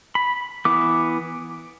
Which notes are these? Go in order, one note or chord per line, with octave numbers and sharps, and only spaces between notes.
B5
E3 B3 D6